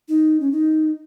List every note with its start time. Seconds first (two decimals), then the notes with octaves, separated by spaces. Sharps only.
0.09 D#4
0.40 C#4
0.52 D#4